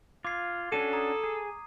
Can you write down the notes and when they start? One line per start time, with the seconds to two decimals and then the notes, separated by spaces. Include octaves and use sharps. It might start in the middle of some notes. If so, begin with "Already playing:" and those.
0.25 F4 D6 G#6 C7
0.72 C#4 D4 F#4 A4 D#7
0.93 A#5 D#6
1.24 G#4